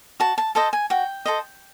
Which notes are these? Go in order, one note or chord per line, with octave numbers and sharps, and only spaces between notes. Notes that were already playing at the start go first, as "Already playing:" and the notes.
F#4 A5
A5
A4 C5 D#5 A5
G#5
F#4 G5
A4 C5 D#5